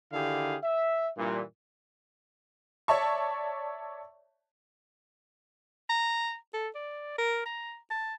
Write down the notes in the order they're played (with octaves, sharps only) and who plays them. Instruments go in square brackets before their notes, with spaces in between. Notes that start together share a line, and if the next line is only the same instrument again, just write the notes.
[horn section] D3 D#3 E4 G4 G#4 F5
E5
G2 A#2 E3
[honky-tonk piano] C#5 D5 E5 A5 C#6
[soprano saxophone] A#5
A4
D5
A#4
A#5
A5